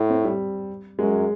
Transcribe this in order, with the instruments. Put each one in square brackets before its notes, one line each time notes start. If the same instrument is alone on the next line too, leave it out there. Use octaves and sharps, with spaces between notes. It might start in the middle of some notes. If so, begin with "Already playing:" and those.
Already playing: [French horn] A2
[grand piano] C4
G3
[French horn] F#2 [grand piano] G#3